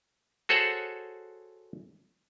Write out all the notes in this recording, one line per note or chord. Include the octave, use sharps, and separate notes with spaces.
F#4 G#4 A4 C5 C#5 F#5